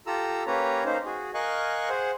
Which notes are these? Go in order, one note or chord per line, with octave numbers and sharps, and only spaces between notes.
F4 G4 A4 A#5 E6
A#3 C#4 G4 B4 C#5 A#5
A#3 C#4 D#4 C5
F#4 G#4
A#4 D#5 F5 G#5 C#6 F#6
G#4 C5 F#5